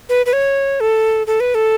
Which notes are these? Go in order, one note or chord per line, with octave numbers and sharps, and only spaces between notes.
B4
B4
C#5
A4
A4
B4
A4